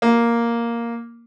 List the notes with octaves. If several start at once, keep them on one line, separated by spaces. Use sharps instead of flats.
A#3